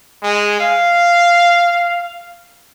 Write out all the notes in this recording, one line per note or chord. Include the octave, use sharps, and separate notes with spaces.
G#3
F5